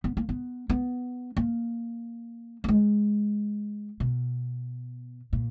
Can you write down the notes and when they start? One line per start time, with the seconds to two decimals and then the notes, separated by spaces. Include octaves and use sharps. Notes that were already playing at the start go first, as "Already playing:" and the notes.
0.04 B3
0.17 A#3
0.29 B3
0.70 B3
1.37 A#3
2.64 A#3
2.68 G#3
4.00 B2
5.33 A#2